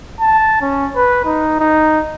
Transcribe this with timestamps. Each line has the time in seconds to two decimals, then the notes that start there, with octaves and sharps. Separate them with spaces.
0.21 A5
0.62 C#4
0.96 B4
1.25 D#4
1.60 D#4